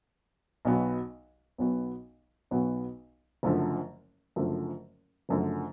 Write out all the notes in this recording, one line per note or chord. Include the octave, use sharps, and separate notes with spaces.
B1 B2 F#3 B3 F#4
B1 B2 F#3 B3 F#4
B1 B2 F#3 B3 F#4
F#1 F#2 D3 F3 A3
F#1 F#2 D3 F3 A3
F#1 F#2 D3 F3 A3